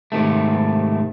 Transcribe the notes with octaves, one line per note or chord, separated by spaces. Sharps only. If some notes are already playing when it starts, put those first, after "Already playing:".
G#2 C3 D#3 A3